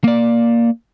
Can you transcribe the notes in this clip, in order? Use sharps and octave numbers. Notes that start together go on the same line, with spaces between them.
A#3 D5